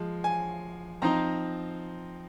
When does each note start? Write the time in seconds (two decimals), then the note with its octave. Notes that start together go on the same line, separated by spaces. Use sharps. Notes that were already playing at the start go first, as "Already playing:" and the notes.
Already playing: F3 G#3
0.24 G#5
1.02 F3 C4 D#4 A#5